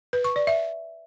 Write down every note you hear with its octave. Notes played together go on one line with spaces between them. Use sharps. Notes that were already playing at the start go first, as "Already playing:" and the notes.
B4
C#6
D5
E5